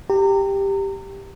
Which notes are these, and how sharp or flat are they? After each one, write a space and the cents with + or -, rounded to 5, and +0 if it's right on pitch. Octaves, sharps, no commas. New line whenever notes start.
G4 +5 A#5 -30